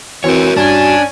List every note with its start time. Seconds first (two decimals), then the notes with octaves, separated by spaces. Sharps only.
0.24 E3 C4 F#4 A#4 C#5
0.56 G2 C#4 D4 G#5